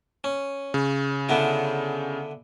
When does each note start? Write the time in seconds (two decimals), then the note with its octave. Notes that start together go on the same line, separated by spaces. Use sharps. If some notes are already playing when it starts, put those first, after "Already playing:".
0.24 C#4
0.74 C#3
1.29 D3 B3 E4